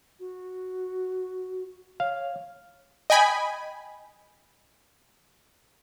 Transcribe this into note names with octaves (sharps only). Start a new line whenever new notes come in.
F#4
C#5 F5
D#5 G5 G#5 B5